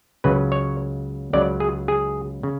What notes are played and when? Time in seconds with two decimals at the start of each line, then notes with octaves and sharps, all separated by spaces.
0.24 C#2 C#3 F#3 B4
0.52 C#5
1.33 C#2 C#3 F#3 D5
1.60 G#4
1.88 G#4
2.43 C#3